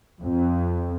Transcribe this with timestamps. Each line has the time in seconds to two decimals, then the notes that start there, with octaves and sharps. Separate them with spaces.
0.23 F2